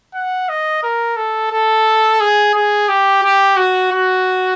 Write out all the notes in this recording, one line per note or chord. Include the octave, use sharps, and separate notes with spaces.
F#5
D#5
A#4
A4
A4
G#4
G#4
G4
G4
F#4
F#4